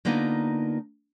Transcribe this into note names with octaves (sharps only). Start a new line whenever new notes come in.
D3 A#3 B3 D#4 F4